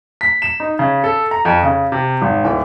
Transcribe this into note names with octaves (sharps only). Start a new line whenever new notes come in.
B6
E7
D#4
C#3
A4
A#5
F2
C#3
C3
G#1
D1